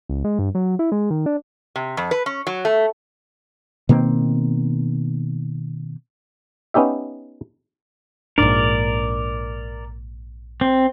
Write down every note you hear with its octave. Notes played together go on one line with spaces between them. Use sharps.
C#2
G#3
G2
F#3
E4
G#3
D#3
D4
C3
F2
B4
C#4
F#3
A3
B2 D#3 A#3 C4
B3 C#4 D#4 G4 E5
A#1 G#2 D4 A#4 D5
C4